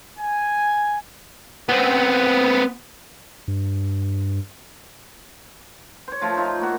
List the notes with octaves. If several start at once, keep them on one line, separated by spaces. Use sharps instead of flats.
G#5
B3 C4
G2
C5 C#5
F3 A3 F4
D#4 F4 E5
A3 A#3 F#4